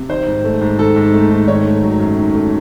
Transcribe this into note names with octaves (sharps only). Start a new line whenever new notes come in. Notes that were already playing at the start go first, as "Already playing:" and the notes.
Already playing: C3
D#3 C5
G#2
A3
G#2
D#3 A4
G#2
A3
G#2
D#3 C#5
A3
F#3
F#2
D#3
A3